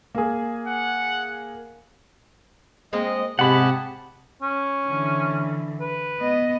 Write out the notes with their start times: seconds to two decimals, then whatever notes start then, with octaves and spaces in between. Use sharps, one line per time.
0.15 A#3 G#4
0.67 F#5
2.93 G#3 A#3 C4 D#5
3.39 G#2 C3 G4 G#4 F#5 A5 B5
4.42 C#4
4.88 D3 E3
5.81 B4
6.20 B3 D#5